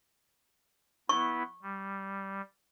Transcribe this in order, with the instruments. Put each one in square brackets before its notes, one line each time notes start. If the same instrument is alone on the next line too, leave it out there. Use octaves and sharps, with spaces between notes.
[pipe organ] B3 E4 [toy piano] C#6
[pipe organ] G3